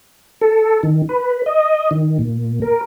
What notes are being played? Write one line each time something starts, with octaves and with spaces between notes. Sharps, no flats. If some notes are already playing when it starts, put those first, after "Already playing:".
A4
D#3
B4
D#5
D#3
A#2
A#4